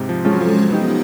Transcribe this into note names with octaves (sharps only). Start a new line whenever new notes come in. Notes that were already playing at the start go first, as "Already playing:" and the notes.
Already playing: G#2 C3
F3
F3 G#3 C#4 F4 A4
F#3
F3
B3 D#4 G4